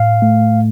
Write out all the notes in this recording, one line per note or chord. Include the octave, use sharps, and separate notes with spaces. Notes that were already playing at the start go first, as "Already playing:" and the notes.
Already playing: A2 F5
A3